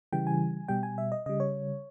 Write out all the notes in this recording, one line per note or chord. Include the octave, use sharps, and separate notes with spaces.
C#3 E3 G3 G5
G#5
B2 G3 G5
G#5
E5
D#5
C#3 G3 D#5
C#5